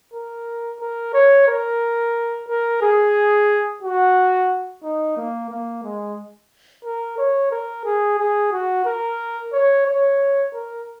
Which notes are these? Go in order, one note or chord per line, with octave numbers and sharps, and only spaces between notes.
A#4
A#4
C#5
A#4
A#4
G#4
F#4
D#4
A#3
A#3
G#3
A#4
C#5
A#4
G#4
G#4
F#4
A#4
C#5
C#5
A#4